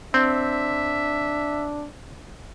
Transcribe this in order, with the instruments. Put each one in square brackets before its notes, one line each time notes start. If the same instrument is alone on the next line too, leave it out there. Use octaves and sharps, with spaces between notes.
[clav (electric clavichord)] C4 [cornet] D4 [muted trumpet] E5